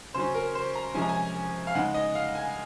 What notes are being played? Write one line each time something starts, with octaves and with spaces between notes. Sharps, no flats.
C#3 F#3 C#4 C5
A#4
C5
A#5
C3 F3 G#3 C#4 G#5
A#5
G#5
F5
C#3 G#3 D#4 F#5
D#5
F5
G#5